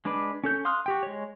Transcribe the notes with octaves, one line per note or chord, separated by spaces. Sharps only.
G#3 D4 B4 D5 B5
C#4 A4 G6
F5 C6 D#6 F6 F#6
F#4 G4 G5
G#3 C#5